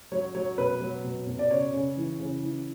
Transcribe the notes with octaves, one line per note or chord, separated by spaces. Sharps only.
F#3 C#5
F#3 C#5
B2 B4
F#3
B2
B2
D5
C#3 C#5
C#3
E3
C#3
E3